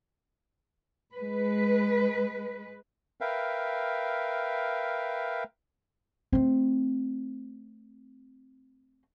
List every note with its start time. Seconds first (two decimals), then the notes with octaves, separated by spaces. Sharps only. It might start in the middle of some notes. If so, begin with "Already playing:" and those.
1.14 G#3 B4
3.21 A#4 B4 E5 F5 G5
6.33 A3 C4